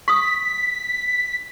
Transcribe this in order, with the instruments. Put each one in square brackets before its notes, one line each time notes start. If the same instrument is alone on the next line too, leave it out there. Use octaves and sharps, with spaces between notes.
[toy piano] C#6 D#6 [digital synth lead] B6